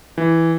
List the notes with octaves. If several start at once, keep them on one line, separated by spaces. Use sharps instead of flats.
E3